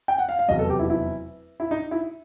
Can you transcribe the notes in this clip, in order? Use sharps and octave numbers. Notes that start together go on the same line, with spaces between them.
G5
F#5
F5
F5
F1 E2 B2 F#3 D#5
A4
G4
E4
E4
E4
D#4
E4